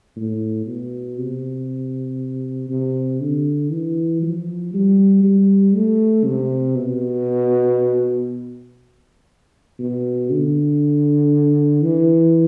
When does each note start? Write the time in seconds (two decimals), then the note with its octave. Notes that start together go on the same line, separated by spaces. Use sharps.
0.16 A2
0.67 B2
1.18 C3
2.69 C3
3.21 D3
3.72 E3
4.23 F3
4.73 G3
5.23 G3
5.75 A3
6.25 C3
6.76 B2
9.79 B2
10.31 D3
11.82 E3